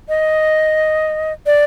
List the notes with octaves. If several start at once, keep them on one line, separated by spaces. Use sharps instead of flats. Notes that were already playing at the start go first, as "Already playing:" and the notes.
D#5
D5